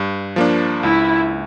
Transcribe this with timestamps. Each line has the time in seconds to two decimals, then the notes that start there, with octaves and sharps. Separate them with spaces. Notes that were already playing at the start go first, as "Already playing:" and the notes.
Already playing: G2
0.36 F3 A#3 D4
0.83 C#2 E4